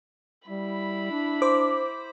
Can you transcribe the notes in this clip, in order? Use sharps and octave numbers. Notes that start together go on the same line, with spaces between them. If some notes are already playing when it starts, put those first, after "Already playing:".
G3 E4 B5
D4
C5 D6